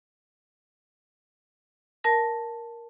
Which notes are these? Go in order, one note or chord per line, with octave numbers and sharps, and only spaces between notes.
A#4 A5 A#6